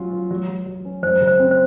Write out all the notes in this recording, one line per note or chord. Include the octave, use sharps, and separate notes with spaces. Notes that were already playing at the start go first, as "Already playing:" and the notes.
Already playing: F#3 C#4 F4
F4
F#3
F#3
F#3
C#4
F#2 C5
C#3
C5
C4
C5